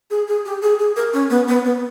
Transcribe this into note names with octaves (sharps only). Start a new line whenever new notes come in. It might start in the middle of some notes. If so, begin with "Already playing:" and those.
G#4
G#4
G4
G#4
G#4
A#4
C#4
B3
B3
B3